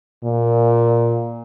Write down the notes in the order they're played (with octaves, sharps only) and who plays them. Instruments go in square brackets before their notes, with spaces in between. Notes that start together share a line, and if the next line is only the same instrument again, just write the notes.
[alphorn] A#2